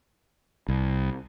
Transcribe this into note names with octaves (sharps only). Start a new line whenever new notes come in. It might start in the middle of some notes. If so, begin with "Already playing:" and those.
C2